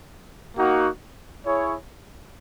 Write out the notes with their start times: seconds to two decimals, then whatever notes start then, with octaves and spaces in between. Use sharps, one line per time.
0.57 A#3 D#4 F#4
1.45 E4 G#4 C#5